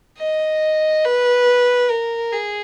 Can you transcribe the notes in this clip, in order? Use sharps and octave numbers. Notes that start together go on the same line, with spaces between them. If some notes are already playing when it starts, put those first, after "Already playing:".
D#5
B4
A#4
G#4